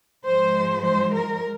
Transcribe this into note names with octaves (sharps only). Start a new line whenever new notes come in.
G#2 F3 G#3 C5
C5
A#4